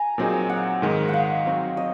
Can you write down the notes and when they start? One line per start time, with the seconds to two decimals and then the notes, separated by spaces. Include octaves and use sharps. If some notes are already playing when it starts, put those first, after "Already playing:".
Already playing: G#5 A#5
0.18 A#2 F#3 C4 D#4 G#4
0.50 F#5
0.82 G#2 D#3 G#3
1.09 F5 F#5
1.46 F#3 C4 D#4 F#4
1.77 D#5